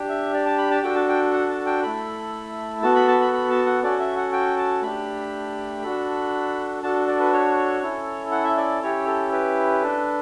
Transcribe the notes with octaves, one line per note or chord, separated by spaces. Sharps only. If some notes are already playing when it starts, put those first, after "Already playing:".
Already playing: D4 G4
E5
D5
A5
B5
A5
D4 F#4 A4 G5
A5
G5
F#5
A5
G5
A3 E4 A4 B5
B3 F#4 A4 A5
B5
A5
B5
B5
A5
F#5
C#4 F#4 A4 D5
E5
F#5
G5
A5
A3 D4 G4 B5
D4 F#4 A4
D4 F#4 A4 A5
D5
B4
C#5
C#4 E4 A4
F#5
E5
D5
C#4 E4 G4 C#5
A4
B4
D4 A4